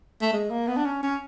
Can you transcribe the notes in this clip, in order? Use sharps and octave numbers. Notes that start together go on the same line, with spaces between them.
A3
G#3
A#3
B3
D4
C#4
C#4